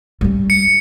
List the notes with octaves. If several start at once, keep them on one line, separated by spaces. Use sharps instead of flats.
G3 C#4
C#7